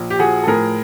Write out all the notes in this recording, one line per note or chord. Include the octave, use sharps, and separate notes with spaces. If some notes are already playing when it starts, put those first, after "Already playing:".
Already playing: A#1
G4
F3 F#4 G#4
A4
A2 G#4 A#4